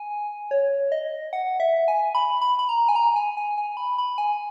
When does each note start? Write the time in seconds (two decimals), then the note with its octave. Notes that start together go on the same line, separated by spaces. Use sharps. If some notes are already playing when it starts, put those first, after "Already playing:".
Already playing: G#5
0.51 C#5
0.92 D#5
1.33 F#5
1.60 E5
1.88 G#5
2.15 B5
2.41 B5
2.59 B5
2.69 A#5
2.89 G#5
2.96 A#5
3.16 G#5
3.37 G#5
3.58 G#5
3.77 B5
3.98 B5
4.18 G#5